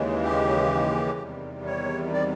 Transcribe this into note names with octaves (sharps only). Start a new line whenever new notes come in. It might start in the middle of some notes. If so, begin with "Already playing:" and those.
Already playing: D#2 C#3 E3 G#3
G4
E2 C3 D#3 G3
C#5
D5